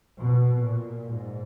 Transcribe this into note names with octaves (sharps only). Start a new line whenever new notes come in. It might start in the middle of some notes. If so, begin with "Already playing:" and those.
B2
A#2
G#2